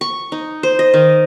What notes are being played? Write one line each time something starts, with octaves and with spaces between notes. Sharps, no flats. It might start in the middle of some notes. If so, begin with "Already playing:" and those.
C#6
D#4
C5
D#5
D#3